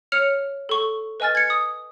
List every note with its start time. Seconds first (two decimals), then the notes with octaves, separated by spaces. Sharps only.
0.12 C#5 F6 C#7 F7
0.69 A4 C#6
1.20 B4 D#5 G#5 F6 A6
1.35 G#6 C#7
1.50 D#6